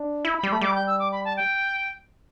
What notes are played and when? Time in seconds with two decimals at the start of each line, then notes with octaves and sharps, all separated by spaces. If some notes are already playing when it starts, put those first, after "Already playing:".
Already playing: D4
0.25 E4
0.37 B5
0.43 G3
0.49 A3 B5
0.61 G3 D6
0.75 G6
0.87 E6
0.99 D6
1.12 B5
1.25 A5
1.37 G5